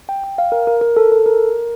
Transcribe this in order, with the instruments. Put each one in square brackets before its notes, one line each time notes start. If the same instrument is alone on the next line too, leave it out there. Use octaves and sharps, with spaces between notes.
[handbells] G5
G5
F5
A#4
A#4
A#4
A4
A4
A#4